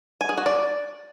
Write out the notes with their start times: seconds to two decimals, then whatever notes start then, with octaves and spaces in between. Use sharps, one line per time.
0.21 G#5
0.29 G#4
0.37 F#4
0.46 D5